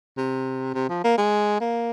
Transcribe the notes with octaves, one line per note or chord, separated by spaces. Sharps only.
C3
C3
F3
A#3
G#3
A#3